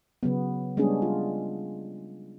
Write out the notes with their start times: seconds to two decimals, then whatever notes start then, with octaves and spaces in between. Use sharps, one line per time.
0.23 C#3 F#3 B3
0.77 G3 G#3 B3 C#4 D4 G#4
1.02 F4